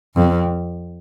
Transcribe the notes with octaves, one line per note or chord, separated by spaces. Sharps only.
F2